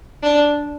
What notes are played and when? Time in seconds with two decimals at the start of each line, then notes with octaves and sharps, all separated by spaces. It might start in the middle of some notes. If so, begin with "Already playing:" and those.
0.23 D4